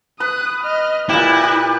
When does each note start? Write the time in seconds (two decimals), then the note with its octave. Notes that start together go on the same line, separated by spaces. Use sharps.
0.20 B4 D#6 F#6
0.64 D#5 F6
1.09 A#2 E4 G4 B4 F#6
1.44 G4